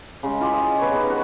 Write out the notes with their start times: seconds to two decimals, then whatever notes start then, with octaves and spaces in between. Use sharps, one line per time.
0.23 C#3 G#3
0.40 E4 F4 G4 G#4
0.54 D#5
0.79 B3 C#5
0.91 C#3 B3 D#4
1.10 F#4 B4